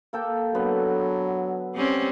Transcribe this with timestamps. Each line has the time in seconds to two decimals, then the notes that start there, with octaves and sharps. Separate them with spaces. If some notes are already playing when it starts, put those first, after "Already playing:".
0.13 A#3 A4 G5
0.55 D3 F#3 B3
1.75 G3 C4 C#4